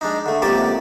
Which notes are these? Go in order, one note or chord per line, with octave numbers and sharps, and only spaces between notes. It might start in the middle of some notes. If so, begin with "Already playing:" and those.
G#3 D4 D#4
D3 A3
C#2 C3 A#3 G4 D5 A5